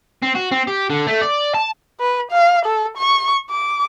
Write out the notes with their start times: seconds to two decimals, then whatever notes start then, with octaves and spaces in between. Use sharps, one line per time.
0.22 C4
0.35 F#4
0.51 C4
0.67 G4
0.90 D3
1.07 A3
1.21 D5
1.54 A5
2.00 B4
2.31 F5
2.65 A4
2.97 C#6
3.50 D6